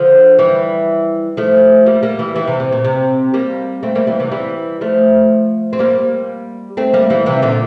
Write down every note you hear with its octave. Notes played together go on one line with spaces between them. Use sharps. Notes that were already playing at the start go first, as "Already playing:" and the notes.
Already playing: D3 F3
E3 G3
F3 A3
G3 A#3
G3 A#3
E3 G3
E3 G3
C3 E3
C3
A#2
C3
G3 A#3
A3 C4
G3 A#3
E3 G3
C3 E3
E3 G3
F3 A3
C4
G3 A#3
A3 C4
G3 A#3
E3 G3
C3 E3
A#2 D3